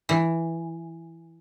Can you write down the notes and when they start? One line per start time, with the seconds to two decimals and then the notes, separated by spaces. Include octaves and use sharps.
0.09 E3